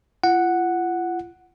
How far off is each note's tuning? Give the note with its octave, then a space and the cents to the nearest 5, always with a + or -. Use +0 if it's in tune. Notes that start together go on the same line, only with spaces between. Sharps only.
F4 -40 F#5 +0